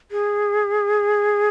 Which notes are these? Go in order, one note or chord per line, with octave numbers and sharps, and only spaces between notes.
G#4